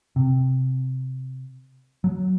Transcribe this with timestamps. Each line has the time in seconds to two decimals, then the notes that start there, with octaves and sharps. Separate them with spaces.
0.16 C3
2.04 F#3